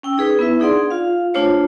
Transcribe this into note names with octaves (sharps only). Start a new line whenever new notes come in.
C#4 G5 E6
D#4 G#4 B4
B3 E4 B4 E5
D4 D#4 G#4 D5 F#5 C6
F4 F5
A3 D4 F4 C5 C#5